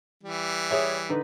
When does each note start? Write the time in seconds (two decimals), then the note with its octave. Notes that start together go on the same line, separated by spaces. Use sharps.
0.24 E3 G3
0.71 G#4 C#5 E5
1.09 D3 D#4 B4